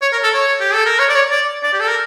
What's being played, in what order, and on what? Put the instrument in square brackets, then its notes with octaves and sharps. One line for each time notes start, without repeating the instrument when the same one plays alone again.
[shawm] C#5
A#4
A4
C#5
G4
A4
A#4
C#5
D5
C#5
D5
D5
G4
A4
A#4